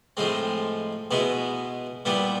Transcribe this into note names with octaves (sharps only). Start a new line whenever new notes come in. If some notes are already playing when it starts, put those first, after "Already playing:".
A2 F3 G#3 C4
B2 G#3 B3 E4
A#2 G3 B3 E4